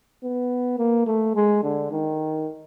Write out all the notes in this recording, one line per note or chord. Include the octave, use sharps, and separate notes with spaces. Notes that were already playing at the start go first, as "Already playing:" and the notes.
B3
A#3
A3
G#3
D3
D#3